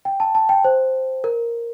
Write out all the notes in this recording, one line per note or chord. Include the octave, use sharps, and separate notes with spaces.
G5
A5
A5
G5
C5
A#4